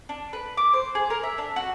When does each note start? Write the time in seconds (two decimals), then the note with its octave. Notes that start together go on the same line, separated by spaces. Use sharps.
0.09 D4
0.33 B4
0.57 D6
0.73 C5
0.95 G#4
1.10 A#4
1.23 E5
1.38 D4
1.56 F#4